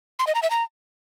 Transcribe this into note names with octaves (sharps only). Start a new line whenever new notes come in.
C6
D#5
A#5
E5
A#5